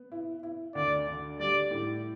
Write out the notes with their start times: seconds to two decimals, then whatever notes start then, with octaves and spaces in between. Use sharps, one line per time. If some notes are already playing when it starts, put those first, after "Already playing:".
Already playing: B3
0.12 E4
0.43 E4
0.75 D2 D5
1.07 D3
1.40 G3 D5
1.71 A2